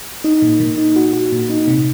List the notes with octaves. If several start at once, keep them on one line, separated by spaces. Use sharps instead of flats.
D#4
A#2
A#2
D#4
F#4
F#4
A#2
D#4
C3